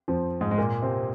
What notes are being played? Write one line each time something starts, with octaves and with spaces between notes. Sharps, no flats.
F2 F3
G#2 G#3
G#3
A#2 A#3
C3 C4